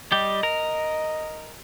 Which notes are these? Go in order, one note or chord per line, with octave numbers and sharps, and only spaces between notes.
G3 G4 D#5
A#4